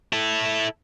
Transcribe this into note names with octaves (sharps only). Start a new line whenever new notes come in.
E4 A4